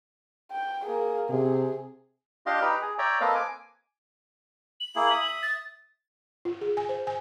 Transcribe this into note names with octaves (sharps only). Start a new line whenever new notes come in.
G5
A#3 G#4
C3 G#4
D4 F4 G4 D#5 F5 C6
D#4 G4 B4 A#5 B5
G#4
C#5 D5 E5 G5 A#5
A#3 C4 A4 B4 D#5 F5
G#5 D6
F#7
A#3 E4 G#4
E5 D#6
A6
F4
G#4
G#5
C5
G#5